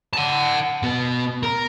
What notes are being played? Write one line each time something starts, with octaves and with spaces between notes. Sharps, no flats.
F#5 A5
B2 B3
A#4